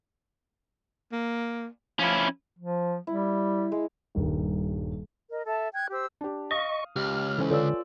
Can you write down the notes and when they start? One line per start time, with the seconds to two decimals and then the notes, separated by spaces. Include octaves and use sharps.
1.12 A#3
1.99 F3 C#4 E4
2.59 F3
3.07 G3 E4
3.72 G#3
4.15 D#1 G2 D#3
5.29 A#4 D#5
5.45 A4 E5 A5
5.73 G5 F#6 G#6
5.90 G4 C5 E6
6.21 D4 G4
6.51 D#5 F5 C#6 D#6
6.96 C#2 G4 F6
7.38 E3 C#4 A4 C5 G#5
7.51 D3 F4 B4 C#5 D5 E6